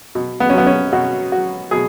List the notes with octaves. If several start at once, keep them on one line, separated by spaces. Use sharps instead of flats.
B2
B3
C#4
F#3 B3
C#4
B2 F#4
F#3 F#4
B2 G#4